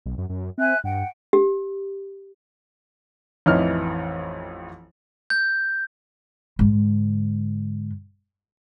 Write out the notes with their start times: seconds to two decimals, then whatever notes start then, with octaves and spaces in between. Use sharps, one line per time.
0.06 B1
0.18 F#2
0.29 F#2
0.58 C4 E5 G#5 F#6
0.84 G2 F#5 G5
1.33 G4
3.46 A1 F2 E3 D#4 F6
5.30 G6
6.59 G#2 D3